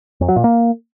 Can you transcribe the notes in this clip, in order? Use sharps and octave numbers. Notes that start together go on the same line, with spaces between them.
F2
F#3
A#2
A#3